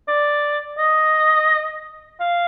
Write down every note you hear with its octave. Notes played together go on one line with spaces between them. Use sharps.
D5
D#5
F5